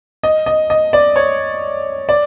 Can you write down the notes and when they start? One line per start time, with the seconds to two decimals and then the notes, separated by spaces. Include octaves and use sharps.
0.23 D#5
0.46 D#5
0.70 D#5
0.93 D5
1.16 C#5
2.09 D5